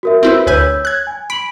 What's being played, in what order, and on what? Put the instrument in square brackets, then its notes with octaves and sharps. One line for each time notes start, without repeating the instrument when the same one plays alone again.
[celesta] F#4 A#4 E5
[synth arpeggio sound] C4 E4 B4
[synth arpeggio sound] D2 B4 G#5 [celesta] C#5 E6 G6
[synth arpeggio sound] F#6 G#6
[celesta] G#5
[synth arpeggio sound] B5 [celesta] D7 F#7